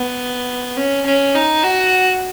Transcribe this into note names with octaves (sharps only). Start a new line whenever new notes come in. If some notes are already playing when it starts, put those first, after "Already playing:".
Already playing: B3
C#4
C#4
D#4
F#4